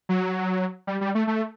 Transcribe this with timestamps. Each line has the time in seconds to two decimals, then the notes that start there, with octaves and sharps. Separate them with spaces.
0.09 F#3
0.87 G3
1.01 G3
1.15 A3
1.27 A3